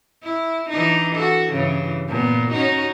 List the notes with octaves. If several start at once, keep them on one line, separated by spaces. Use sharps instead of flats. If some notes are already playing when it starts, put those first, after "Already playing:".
E4
E3 D4 D#4
F#4 A4
G2 C#3 E3
A#2 B3
C#4 D#4 F#4